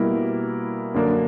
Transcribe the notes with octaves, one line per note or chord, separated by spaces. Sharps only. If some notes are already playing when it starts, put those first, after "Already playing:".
Already playing: B2 G3 A#3 E4 A#4
F#2 D3 A#3 D4 A#4